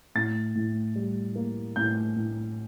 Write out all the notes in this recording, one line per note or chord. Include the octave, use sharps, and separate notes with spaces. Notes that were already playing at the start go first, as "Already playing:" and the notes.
A2 A6
A2
G3
A#3
A2 G6
A2